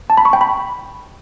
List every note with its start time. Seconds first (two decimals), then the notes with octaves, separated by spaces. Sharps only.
0.10 A5
0.17 B5
0.25 C#6
0.33 G5
0.41 B5